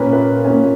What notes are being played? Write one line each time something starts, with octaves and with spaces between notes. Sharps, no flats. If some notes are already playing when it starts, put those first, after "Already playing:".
Already playing: A#2 A#3 C#4 B4
B4
A#2 A#3 C#4